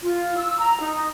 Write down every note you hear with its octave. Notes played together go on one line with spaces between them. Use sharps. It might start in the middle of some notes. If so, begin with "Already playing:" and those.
F4
E6
A#5
D#4